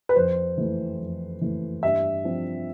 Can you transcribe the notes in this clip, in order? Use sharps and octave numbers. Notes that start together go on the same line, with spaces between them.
B4
F2 C5
E3 A3
F2
E3 A3
G2 E5
F3 C4